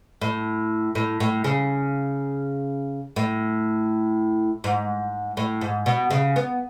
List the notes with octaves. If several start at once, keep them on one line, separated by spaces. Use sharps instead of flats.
A2
A2
A2
C#3
A2
G#2
A2
G#2
B2
C#3
B3